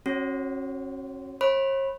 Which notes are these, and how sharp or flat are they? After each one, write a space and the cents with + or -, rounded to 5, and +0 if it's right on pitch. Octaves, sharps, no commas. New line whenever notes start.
C#4 -40 F#4 +0 C#5 +15
C#5 -45 B5 +0